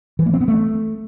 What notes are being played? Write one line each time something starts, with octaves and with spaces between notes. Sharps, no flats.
E3
A#3
C4
B3
A3